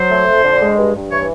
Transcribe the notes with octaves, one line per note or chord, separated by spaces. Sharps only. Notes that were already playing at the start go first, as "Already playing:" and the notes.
Already playing: F#3 C5
A3
F2
D3
G#3
G2
G2
E3 C#5